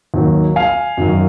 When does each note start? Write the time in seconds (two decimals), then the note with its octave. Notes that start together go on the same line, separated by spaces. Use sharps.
0.14 D#2 D#3 F#3
0.56 F5 G#5
0.97 F#2 D#3 F#3